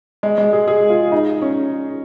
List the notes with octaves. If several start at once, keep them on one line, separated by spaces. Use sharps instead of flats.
G#3
G#3
G#4
G#4
F4
D#4
C#4